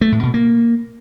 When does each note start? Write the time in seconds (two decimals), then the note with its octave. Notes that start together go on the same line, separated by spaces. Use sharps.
0.01 A3
0.12 A2
0.23 B2
0.34 A#3